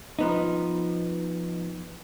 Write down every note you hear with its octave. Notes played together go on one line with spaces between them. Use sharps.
F3 B3 D#4